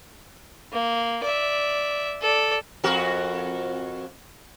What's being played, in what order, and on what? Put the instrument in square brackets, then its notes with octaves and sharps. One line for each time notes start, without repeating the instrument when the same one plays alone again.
[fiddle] A#3
D5 E5
A4 D5
[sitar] F2 F#4 A#4